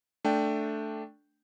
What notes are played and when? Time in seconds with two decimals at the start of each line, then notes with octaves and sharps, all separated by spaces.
0.25 A3 D4 G5